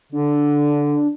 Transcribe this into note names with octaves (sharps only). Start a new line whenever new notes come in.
D3 D4